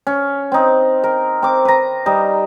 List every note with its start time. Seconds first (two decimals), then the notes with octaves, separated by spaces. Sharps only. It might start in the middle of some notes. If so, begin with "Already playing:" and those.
0.07 C#4
0.52 C4 D#4
1.04 A#4
1.42 C4 D6
1.65 B4 A#5
2.06 G3 D#4